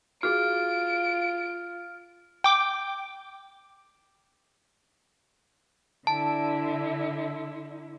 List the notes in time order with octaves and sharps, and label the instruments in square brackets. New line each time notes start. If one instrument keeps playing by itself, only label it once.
[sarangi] F4 [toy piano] F#4 G#4 [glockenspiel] F6 [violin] D7
[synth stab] G5 D6
[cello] D3 E4 [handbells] A5